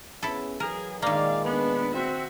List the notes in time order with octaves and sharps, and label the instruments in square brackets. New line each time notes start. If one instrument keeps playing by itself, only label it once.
[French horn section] B3 C#4 G#4 [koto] E4 A4
[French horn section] E3 F#3 [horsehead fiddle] G#4 [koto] A#4
[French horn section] A#2 G#3 [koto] D#3 A#3 [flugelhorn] D5 [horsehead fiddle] F5
[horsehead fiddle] B3 D4 [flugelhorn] B4
[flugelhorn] C4 [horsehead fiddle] F#4 E5